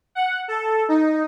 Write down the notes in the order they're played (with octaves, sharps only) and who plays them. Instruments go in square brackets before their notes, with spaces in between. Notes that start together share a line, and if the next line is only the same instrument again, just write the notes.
[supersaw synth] F#5
A4
D#4